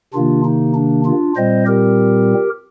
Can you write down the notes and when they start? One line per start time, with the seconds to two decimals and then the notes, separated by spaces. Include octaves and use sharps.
0.14 C3 D#3 A#3 D4 F4
0.45 D#4
0.75 D4
1.06 D4 F4
1.36 A#2 G3 C4 C5 D#5
1.67 G4 A#4